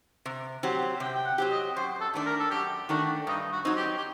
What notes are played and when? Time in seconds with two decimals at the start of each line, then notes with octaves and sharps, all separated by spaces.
0.26 C3
0.63 F#3 C4 G4
1.00 C3 G5
1.14 G5
1.26 F#5
1.38 F#3 C4 G4
1.51 D#5
1.76 F#2 C5
2.01 A4
2.14 D#3 A3 D4
2.26 A#4
2.40 A4
2.51 F#2 G4
2.89 D#3 A3 D4 F#4
3.27 G2 D#4
3.52 F#4
3.65 F#3 C4 D#4
3.76 G4
3.97 G4